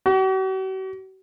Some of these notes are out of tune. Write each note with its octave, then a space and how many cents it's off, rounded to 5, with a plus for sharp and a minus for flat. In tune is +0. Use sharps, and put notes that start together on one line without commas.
F#4 +45